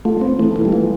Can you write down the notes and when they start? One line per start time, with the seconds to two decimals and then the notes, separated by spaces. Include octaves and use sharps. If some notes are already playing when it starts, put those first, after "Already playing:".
0.05 A3 F4
0.21 B3 C4
0.38 E3 A3
0.55 E3 A3
0.65 G3
0.72 A3 F4